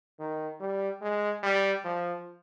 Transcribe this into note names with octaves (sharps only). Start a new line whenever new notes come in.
D#3
G3
G#3
G3
F3